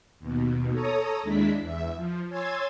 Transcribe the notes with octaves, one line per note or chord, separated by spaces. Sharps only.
D#2 B2
A4 C#5 A#5 D#6
D#2 G#3 D4 E4 B6
E2 E5
F3
C#5 G#5 C6 E6 G#6 A6